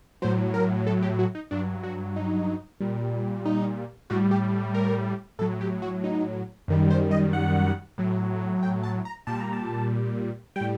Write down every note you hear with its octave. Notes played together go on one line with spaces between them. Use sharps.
A2 F#3 C5
A#4
A4
G4
F#4
D#4
G2 F#3 D4
F#4
D#4
A#2 G3
D#4
A2 G3 F#4
G4
A#4
A2 F#3 A4
G4
F#4
D#4
F#2 D#3 G3
C5
D#5
F#5
A2 F#3
G5
A5
A#5
A#2 G3 A5
A#5
A5
A2 G3 G5